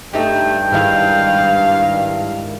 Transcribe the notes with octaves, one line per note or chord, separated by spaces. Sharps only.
G2 A3 D#4 G4 G5
G#2 D#3 E4 F5